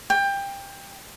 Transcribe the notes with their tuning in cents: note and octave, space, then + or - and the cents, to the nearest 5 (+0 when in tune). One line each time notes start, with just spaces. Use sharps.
G5 +20